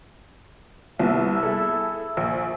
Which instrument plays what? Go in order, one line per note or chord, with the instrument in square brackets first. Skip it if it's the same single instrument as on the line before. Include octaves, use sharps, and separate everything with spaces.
[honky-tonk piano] C2 B3 [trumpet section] E4 E5
[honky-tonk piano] G#4 A4
A#1